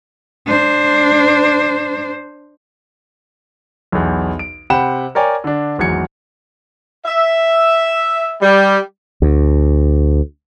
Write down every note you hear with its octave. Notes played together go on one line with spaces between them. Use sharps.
D4 C5
B1 E2
D7
C3 C5 F#5 G5 B5 E7
A#4 C#5 D5 G5 G#5
D3 D4
G#1 E2 F#3 G#6 C#7
E5
G3
D2